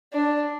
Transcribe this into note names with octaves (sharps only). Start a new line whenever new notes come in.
D4